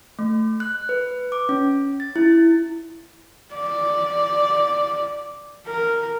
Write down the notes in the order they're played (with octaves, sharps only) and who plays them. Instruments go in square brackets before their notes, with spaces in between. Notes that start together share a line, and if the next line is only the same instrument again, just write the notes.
[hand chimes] A3
F#6
B4
D6
C#4
A6
E4
[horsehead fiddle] D5
A#4